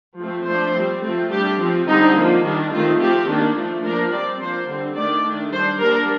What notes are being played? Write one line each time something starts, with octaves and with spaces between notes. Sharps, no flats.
F3 A3 C4
F3 A3 D4 C5
G3 C4
F3 A3 C4
G3 D4 G4
F3 C4
D3 G3 C4 D#4
F3 A#3 D4
D#3 G3 D4 F4
D#3 A3 C4 F4
F3 C4 G4
D#3 A#3 D4
F3 A3 D4
F3 A#3 D4 A#4
G3 C4 D5
F3 A#3 D4 C5
D3 G3 C4
D#3 A3 D4 D5
D#3 A3 D4
G3 D4 C5
G3 A#3 D4 A#4